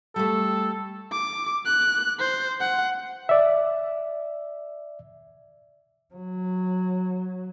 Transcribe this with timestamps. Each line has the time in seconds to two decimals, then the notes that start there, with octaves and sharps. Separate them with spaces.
0.16 G3 A3 A4
1.12 D6
1.66 F#6
2.19 C5
2.61 F#5
3.29 D5 E5
6.14 F#3